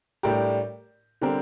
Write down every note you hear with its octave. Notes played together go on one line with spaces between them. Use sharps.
A2 G3 D4 G4 A#4
D3 G3 C4 G4 A#4